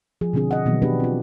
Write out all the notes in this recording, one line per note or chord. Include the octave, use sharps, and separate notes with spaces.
F3 G#4
B2 D3 C4 D4 G#4
D#5 F#5
B2 D#3 E3 F#3 B3
B3 D4 F#4 G4 B4
C4 F4